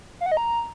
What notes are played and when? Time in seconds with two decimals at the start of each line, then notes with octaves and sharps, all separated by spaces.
0.21 F5
0.26 F#5
0.32 D#5
0.37 A#5